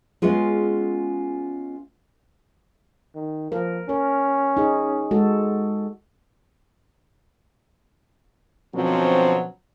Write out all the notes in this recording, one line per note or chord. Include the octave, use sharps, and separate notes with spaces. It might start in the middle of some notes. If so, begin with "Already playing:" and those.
G#3 B3 C#4 F4 G#4
D#3
F3 A#4
C#4 A#4
D#4 G#4
G#3 F#4 A4
B2 D3 F3 F#3 C4 C#4